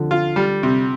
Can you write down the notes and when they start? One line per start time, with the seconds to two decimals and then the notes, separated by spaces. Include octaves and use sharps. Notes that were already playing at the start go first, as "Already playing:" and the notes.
Already playing: D3 F3
0.11 F4
0.36 G3
0.63 C3